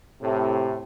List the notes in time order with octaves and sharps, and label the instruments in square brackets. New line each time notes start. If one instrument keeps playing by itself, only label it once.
[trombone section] A2 [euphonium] C3